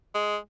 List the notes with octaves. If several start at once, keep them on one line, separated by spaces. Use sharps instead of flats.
G#3